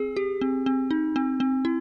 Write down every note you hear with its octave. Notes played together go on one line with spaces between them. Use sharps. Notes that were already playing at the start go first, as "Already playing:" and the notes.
Already playing: C4 G#4
G4
C4
C4
D#4
C4
C4
E4